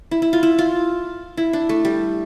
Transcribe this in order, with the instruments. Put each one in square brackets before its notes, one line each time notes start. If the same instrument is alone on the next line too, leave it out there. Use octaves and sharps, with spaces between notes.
[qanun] E4
E4
F4
E4
F4
E4
D4
A3
G3